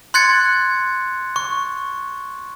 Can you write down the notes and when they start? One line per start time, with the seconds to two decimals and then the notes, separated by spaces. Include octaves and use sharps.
0.14 C6 F#6 G#6 A6 C#7
1.36 C#6